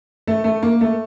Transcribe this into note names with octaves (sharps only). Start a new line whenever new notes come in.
A3
A3
A#3
A3